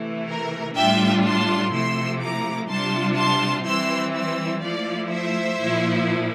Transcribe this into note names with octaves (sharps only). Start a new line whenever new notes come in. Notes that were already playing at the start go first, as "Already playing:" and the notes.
Already playing: C3 E3 A3 E4
A#4
A2 G3 D4 F4 E5 G5
A5 C6
C3 F3 A3 E4 C6 E6
A#5 D6
C3 G3 D4 F4 A5 C6
A5 C6
E3 G3 C4 E4 C6 E6
C6 E6
F3 A3 E4 D5 F5
C5 E5
A#2 F3 A#3 E4